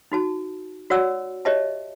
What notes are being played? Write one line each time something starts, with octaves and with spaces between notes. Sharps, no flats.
D#4 F#4 A5
F#4 C#5 D5 F#5 E6
G4 C#5 D#5 E5 A5